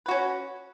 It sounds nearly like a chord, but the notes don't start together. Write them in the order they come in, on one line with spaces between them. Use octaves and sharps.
B4 F#4 C#4